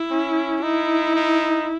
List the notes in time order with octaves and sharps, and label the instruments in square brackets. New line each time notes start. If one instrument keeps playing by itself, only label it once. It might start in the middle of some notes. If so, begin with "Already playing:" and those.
Already playing: [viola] E4
[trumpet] C#4
[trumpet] D#4 [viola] E4
[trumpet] D#4